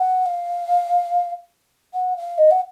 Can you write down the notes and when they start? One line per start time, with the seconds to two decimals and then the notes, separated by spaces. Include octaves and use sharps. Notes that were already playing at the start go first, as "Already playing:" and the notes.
Already playing: F#5
0.26 F5
1.94 F#5
2.17 F5
2.38 D#5
2.51 F#5